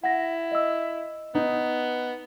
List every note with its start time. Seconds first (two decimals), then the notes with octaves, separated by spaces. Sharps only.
0.04 E4 F#5 A#6
0.52 D#5 E6
1.35 B3 D#4